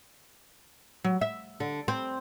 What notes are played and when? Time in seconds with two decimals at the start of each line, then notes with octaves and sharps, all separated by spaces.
1.04 F#3
1.21 E5
1.60 D3
1.88 C4